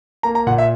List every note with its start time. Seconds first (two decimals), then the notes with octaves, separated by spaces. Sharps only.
0.23 A#3 A#5
0.35 A#5
0.47 A#2 F#5
0.58 E5